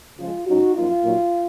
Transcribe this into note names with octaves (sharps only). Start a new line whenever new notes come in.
C#3 F3 G#3 F4
G#2 F#3 C#4 D#4 F#4
F#2 F3 A#3 D#4 F4
A#2 F#3 A#3 D#4